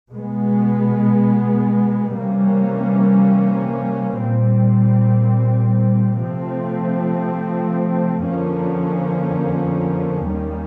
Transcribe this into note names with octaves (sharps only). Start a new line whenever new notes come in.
B2 G#3 B3
C3 E3 G3 A#3 C#4
A#2 G3 C4
C3 F3 A3 C4
F2 D3 F3 A#3 C#4
D#2 D#3 G3 A#3 C#4